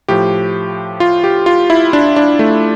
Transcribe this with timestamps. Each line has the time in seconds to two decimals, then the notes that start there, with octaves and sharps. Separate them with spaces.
0.08 A2 F3 G4
1.00 F4
1.24 G4
1.46 F4
1.70 E4
1.93 D4
2.16 D4
2.39 A3